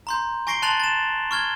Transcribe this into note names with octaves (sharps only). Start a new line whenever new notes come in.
A#5 C6 G6
G#5 C#6 A#6 C7 D7 G7
A5 C6 F#6 A6 F7 F#7
A6 E7
C#6 F6 G#6 G7